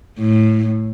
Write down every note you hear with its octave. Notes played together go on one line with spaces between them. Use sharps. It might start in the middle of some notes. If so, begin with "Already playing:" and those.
A2